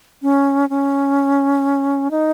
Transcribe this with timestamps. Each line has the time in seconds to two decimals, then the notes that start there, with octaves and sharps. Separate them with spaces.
0.22 C#4
0.69 C#4
2.11 D#4